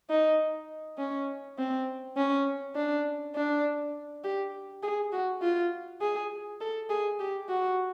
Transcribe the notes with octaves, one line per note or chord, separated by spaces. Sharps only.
D#4
C#4
C4
C#4
D4
D4
G4
G#4
F#4
F4
G#4
A4
G#4
G4
F#4